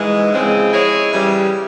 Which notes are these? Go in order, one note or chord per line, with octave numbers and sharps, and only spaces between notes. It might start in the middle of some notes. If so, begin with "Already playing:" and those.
Already playing: G#2 E3 G#3
E2 C#3 F3 G#3 C4
G#3 E4 G#4 C#5
C#3 E3 G3